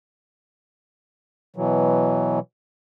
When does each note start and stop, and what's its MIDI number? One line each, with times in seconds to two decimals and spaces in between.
1.56 2.39 47
1.56 2.39 52
1.56 2.39 54